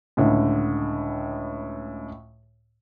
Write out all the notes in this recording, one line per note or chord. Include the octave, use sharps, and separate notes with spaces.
C#2 A2 D3